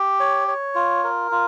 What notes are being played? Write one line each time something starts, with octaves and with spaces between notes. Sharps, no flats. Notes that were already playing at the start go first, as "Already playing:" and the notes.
Already playing: G4
C#5
C#5
F4
A#4
F4